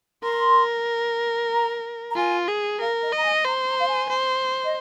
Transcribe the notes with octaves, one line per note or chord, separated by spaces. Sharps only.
A#4 C6
A#5
A#5
F4 G#5
G#4
A#4 F5
D#5
D#5 A#5
G#5
C5 A#5
A#5
F5
G#5
C5
D#5